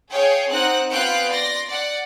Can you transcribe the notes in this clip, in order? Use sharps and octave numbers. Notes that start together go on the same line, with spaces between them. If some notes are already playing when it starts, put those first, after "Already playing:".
G#4 C#5 F5 G5
C4 D#4 F#5 F#6
B3 F4 F5 G5 F#6
D5 C6 A#6
D5 F#5